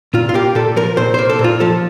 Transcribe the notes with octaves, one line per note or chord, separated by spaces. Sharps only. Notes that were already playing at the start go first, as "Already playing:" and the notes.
A#2 F4
F4
A#3 G4
A#2 A4
F3 A#4
A#2 C5
A#3 C5
A4
A#2
F4
F3 A4